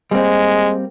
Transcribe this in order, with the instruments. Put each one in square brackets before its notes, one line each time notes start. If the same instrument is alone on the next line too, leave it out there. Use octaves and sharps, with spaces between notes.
[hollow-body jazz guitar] G3 A#3 C4 [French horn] G#3